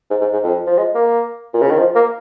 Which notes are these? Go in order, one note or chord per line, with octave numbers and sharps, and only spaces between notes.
G#2
G#2
G#2
F2
F3
G#3
A#3
A#2
C#3
D#3
F3
A#3